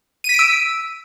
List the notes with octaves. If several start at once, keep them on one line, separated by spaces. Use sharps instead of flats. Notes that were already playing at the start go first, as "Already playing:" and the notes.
E6 B6 D7 D#7